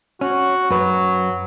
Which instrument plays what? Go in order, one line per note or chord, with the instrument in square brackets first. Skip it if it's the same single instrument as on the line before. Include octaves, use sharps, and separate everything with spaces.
[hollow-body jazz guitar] C#4 [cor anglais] F#4
[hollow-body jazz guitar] F#2 B4 [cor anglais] F#3